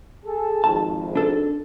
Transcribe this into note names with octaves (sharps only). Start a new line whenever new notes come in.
G#4 A4
G#1 F2 A5
D4 A4